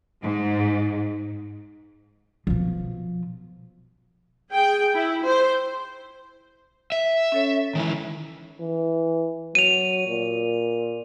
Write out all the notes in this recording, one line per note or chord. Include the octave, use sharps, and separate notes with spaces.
G#2
B2 F3
G#4 G5
E4
C5
E5
C#4 A4 C#5
D#3 E3 G#3
E3
F#3 D#7 F7
A#2